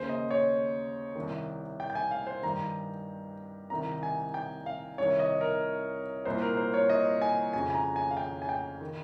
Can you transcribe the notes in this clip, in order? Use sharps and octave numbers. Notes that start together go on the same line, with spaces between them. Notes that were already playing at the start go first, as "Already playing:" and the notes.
Already playing: D#2 C#3 C5
D#5
C#5
C2 C3 D#3
G5
G5
G#5
F5
C5
G2 D#3 A#5
C2 C3 D#3 A#5
G#5
G5
F5
C2 C3 D#3 C#5
D#5
A#4
C2 A#2 C5
A#4
C5
C#5
D#5
G#5
F2 C#3 G#5
G#5
A#5
G#5
F5
G5
G#5
G5
D#3